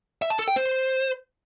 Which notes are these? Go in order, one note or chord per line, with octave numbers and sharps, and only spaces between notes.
E5
A5
A4
G5
C5